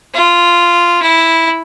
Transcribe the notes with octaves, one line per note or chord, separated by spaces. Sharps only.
F4
E4